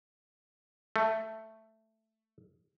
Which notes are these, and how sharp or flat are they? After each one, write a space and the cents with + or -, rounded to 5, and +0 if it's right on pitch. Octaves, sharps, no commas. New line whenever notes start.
A3 +5